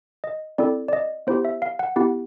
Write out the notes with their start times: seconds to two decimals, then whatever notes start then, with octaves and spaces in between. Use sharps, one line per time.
0.24 D#5
0.58 C4 E4 A4 D5
0.88 D5
0.93 D#5
1.27 B3 E4 G4 C5
1.45 E5
1.62 F5
1.79 F#5
1.96 B3 E4 G4 F#5